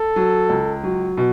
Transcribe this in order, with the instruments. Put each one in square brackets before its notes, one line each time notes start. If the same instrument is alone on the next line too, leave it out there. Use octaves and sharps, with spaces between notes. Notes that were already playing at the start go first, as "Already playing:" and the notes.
Already playing: [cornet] A4
[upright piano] F#3
C#2
F#3
B2